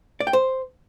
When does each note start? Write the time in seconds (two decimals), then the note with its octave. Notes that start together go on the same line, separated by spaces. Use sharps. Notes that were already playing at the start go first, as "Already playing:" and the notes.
0.20 D5
0.27 G5
0.33 C5